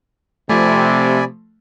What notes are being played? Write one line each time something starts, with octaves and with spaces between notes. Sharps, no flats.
C3 F3 A3 D5 G#5 B5